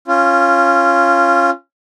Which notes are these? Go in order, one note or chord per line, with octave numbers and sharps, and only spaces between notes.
C#4 F4